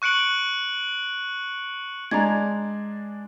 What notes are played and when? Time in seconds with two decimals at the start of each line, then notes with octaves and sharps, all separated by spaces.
0.02 C#6 F#6 C#7 D7 F#7
2.11 G#3 D4 D5 A#5 G#6